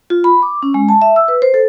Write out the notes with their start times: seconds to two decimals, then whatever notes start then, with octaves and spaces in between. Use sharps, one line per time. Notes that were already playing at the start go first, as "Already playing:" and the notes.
0.10 F4
0.24 B5
0.42 D6
0.63 C#4
0.74 G#3
0.89 A5
1.02 E5
1.16 E6
1.28 B4
1.42 C5
1.54 A4